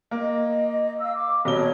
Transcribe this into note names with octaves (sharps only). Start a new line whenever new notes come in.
A#3 D#5
F5 E6
D6
D#1 B2 C#5 G7